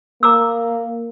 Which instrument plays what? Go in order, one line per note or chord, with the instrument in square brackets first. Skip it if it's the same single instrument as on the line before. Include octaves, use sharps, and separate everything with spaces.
[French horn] A#3 [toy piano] A#5 D6 E6